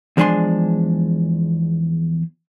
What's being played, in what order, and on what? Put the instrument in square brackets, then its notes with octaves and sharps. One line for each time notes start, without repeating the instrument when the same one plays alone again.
[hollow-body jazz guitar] E2 F3 G#3 D4 G#5 C6